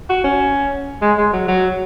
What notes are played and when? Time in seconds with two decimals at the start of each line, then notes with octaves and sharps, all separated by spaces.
0.09 F#4
0.24 C#4
1.02 G#3
1.18 G#3
1.33 F#3
1.48 F#3